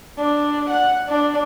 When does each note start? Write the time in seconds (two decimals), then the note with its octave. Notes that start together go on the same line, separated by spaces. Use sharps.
0.17 D4
0.70 F#5
1.09 D4